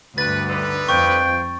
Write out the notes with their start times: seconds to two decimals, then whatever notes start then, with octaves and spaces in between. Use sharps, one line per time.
0.18 D2 G2 B4 A6
0.50 D3 D#4 B4
0.89 F2 F4 C5 G5 C#6